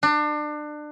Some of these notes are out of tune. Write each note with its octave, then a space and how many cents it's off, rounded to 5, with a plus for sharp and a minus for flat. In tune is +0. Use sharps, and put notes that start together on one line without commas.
D4 +30